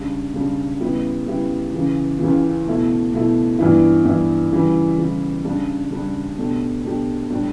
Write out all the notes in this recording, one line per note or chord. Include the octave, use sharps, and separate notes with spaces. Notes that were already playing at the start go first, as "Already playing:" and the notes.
Already playing: C#3 G3 D4
C#3 G3 D4
C#3 G3 B3 E4 G4
C#3 G3 B3 E4 G4
C#2 C#3 E3
C#2 C#3 E3
B2 A3 E4
B2 A3 E4
G2 E3 B3 E4
G2 E3 B3 E4
C#3 E3 G3
C#3 E3 G3
C#3 G3 D4
C#3 G3 D4
B2 A3 D4 G4
B2 A3 D4 G4
A2 G3 D4 G4